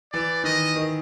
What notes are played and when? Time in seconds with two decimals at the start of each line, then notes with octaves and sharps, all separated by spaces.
0.13 E3 D5
0.44 D#3 D#5
0.76 D#3